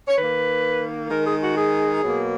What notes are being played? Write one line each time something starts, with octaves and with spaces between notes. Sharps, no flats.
C#5
D#3 A#3 B4
D#3 G#3 A#4
G#4
F#4
G#4
B2 F#3 A#3